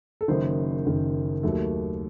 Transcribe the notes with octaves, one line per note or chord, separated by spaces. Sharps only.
A4
F#1 F#2 D#3 C5
F#1 F#2 D#3
D#2 D#3 F#3 A3